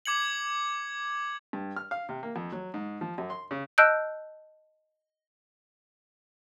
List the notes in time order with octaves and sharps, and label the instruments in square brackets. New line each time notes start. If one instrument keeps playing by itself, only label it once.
[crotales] D6 G#6 C#7 F#7
[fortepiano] G2
F6
F5
C3
A#3
F2
F#3
G#2
F3
F#2
C6
C#3
[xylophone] D#5 A5 E6 F#6 G6 D7